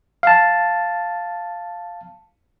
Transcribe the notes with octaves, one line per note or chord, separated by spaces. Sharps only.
F5 A5